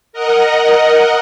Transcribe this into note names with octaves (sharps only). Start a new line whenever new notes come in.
A#4 D#5 F#5